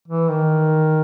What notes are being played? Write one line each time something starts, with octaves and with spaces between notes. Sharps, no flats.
E3
D#3